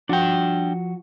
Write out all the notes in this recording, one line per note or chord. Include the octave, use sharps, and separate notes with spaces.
F3 D4 F#4 G5